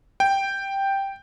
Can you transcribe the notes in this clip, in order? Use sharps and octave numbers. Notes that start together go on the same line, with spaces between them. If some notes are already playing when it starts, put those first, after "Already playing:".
G5